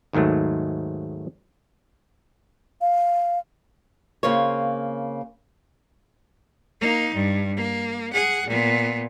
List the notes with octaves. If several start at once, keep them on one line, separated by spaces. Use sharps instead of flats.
D#2 G#2 D#3 F#3 A3
F5
C#3 A#3 C4 F4 C#5
A#3 D#4
G2
A#3
G#4 F#5
A#2 B3